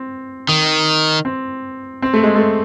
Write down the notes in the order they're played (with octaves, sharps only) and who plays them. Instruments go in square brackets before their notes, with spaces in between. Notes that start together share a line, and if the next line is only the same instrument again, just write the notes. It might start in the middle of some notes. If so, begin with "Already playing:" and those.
Already playing: [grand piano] C4
[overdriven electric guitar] D#3
[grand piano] C4
C4
A3
G#3
A3